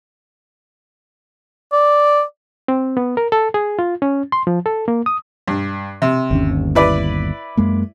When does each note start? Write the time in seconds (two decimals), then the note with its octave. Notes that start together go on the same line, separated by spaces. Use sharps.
1.73 D5
2.68 C4
2.97 B3
3.17 A#4
3.32 A4
3.54 G#4
3.79 F4
4.02 C#4
4.32 C6
4.47 F3
4.66 A4
4.88 A#3
5.06 D#6
5.47 G2
6.02 C3
6.31 G1 D#2 C#4
6.75 E4 B4 D5
7.57 F#2 G#3 A#3